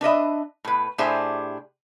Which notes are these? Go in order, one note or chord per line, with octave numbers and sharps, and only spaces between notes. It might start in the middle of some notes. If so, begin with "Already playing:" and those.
D4 B4 D#5 E5
A2 B4
A2 D4 G4 G#4 C5 E5